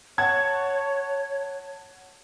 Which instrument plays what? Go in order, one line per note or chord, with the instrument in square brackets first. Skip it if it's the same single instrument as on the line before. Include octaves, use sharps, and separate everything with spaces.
[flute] C#5 [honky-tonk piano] F#5 A5 G#6